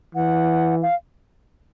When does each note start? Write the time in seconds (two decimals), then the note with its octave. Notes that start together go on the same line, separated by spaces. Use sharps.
0.15 E3 F#5
0.82 F5